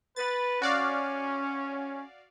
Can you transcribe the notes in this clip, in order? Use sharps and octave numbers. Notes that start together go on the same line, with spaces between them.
B4 A6
C#4 F#4 D5 F5